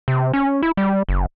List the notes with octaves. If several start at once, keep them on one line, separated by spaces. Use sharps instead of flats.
C3
C#4
E4
G3
F#1